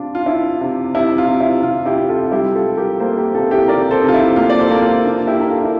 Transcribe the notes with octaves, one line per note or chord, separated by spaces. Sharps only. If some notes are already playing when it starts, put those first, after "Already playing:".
Already playing: C3 D4 F4
F4
D4 E4
C3
C3 E4
F4
C3
E4
C3 F4
E4 G4
C3
F4 A4
F4
G3 E4 G4
F4 A4
G3
G4 A#4
A#3 A4 C5
G4 A#4
C3 F4 A4
E4 G4
C3 A#4 D5
A4 C5
C3
F4
E4
A#3 F4
D5
A4 C5
A#3
F4
D4 F4
E4 G4
D4 A#4
F4 A4
E4